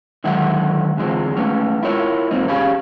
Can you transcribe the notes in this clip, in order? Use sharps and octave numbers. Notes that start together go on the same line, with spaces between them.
D3 D#3 F#3 G#3 E5 F#5
E2 D3 F3 G#3 C4
G#3 A3 B3 C#4
E4 F4 A#4 C#5 E5
G#2 F3 A#3 C4 D#4
C#4 G4 G#4 F5 B5